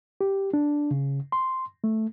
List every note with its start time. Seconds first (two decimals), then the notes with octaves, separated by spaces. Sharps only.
0.21 G4
0.53 D4
0.91 C#3
1.32 C6
1.84 A3